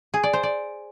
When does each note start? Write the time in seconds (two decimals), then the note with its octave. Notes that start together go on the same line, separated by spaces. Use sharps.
0.14 G#4
0.24 D5
0.33 C5
0.43 D5